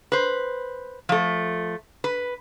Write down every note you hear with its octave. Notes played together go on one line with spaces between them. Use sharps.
B4 C5
F3 A3
B4